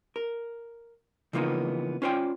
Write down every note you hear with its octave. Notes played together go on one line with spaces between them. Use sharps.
A#4
C#3 E3 F3 A#3 B3 D#4
C#4 F4 C5 D5 G5